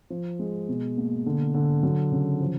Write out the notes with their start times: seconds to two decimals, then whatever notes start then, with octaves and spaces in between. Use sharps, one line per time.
0.10 F3
0.39 G#3
0.68 B2
0.97 A#3
1.26 D3
1.54 D3
1.83 F#3
2.12 C#3
2.40 F3